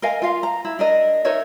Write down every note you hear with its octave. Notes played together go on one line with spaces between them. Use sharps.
A#4 D#5 F5 G#5
F4 F5
A#5
E4
D4 A#4 D#5
D#4 A#4 C#5 E5